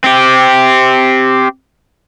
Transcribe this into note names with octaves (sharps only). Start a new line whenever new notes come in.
C4 G4